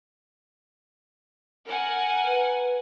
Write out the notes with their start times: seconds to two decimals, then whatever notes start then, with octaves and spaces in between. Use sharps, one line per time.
1.66 A#4 F#5 G#5
2.27 B4